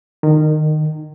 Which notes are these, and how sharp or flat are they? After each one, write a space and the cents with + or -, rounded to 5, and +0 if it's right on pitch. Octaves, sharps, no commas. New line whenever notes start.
D#3 -20